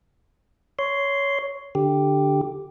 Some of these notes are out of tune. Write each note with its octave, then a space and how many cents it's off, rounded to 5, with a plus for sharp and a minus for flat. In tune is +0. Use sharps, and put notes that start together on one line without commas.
C#5 +10 C6 -5
D3 +0 G4 +0